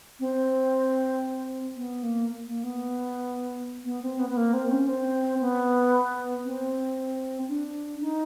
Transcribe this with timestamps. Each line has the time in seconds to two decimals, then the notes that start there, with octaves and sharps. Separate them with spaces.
0.20 C4
1.76 B3
2.03 A#3
2.46 A#3
2.64 B3
3.85 B3
4.03 C4
4.19 B3
4.29 B3
4.37 A#3
4.54 C4
4.71 C#4
4.88 C4
5.41 B3
6.45 C4
7.48 D4
8.01 D#4